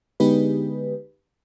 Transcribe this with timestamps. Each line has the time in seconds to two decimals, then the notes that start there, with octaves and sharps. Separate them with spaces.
0.20 D3 G#3 B3 D#4 G4 B4